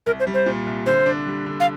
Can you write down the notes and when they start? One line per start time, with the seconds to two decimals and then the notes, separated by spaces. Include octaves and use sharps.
0.06 C2 A#4
0.20 C5
0.27 G3
0.34 C5
0.46 A#2
0.67 C2
0.86 D3 C5
1.06 D4
1.27 G3
1.46 D3
1.60 F5